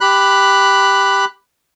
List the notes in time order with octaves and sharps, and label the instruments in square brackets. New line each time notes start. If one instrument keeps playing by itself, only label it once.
[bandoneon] G4 B5 F#6